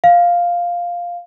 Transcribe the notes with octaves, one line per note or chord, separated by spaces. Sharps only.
F5